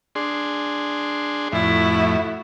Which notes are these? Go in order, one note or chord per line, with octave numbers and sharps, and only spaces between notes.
D4 G#4 C6
F2 A2 E4 F#4